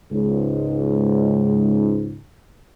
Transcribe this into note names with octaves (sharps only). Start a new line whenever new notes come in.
C#2 G#2